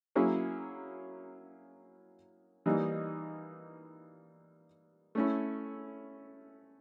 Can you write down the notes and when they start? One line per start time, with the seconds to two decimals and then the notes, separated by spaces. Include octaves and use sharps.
0.15 F#3 A#3 C#4 E4 G#4
2.66 E3 G3 A#3 D#4
5.15 A3 C#4 E4